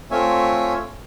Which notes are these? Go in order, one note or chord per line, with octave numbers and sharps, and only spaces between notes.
A3 C4 F4 C#5 E5 G#5